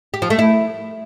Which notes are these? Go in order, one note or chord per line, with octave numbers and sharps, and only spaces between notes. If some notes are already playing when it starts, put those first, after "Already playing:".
G4
F3
A3
E4